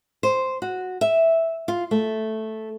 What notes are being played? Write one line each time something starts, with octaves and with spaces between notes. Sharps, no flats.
C5
F#4
E5
F4
A3